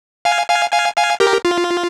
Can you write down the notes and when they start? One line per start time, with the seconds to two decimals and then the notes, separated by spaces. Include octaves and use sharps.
0.25 F5 G#5
0.49 F5 G#5
0.72 F5 G#5
0.97 F5 G#5
1.20 G4 A#4
1.45 F4